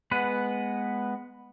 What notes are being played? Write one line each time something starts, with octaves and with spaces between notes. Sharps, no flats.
G#3 B3 B4 F#5